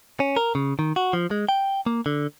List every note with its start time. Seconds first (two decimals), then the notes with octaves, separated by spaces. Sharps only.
0.20 C#4
0.37 A#4
0.55 C#3
0.79 D#3
0.96 F#4
1.13 F3
1.31 G#3
1.49 G5
1.86 A#3
2.06 D3